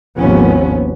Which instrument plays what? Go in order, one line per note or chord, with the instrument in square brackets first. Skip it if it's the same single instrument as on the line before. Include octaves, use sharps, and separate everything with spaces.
[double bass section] G#1 D#2 C3 F3 B3 C#4